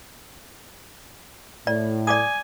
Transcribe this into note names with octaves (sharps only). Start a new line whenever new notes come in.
A2 D5
D5 G#5 D6 D#6